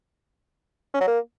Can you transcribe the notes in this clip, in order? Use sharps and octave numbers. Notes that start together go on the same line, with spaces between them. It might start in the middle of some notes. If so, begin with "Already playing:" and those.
C#4
F#3
A#3